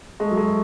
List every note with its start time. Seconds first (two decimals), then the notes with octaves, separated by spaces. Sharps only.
0.20 G#3 A4 E5 A5 C#6
0.31 F#3
0.37 G#3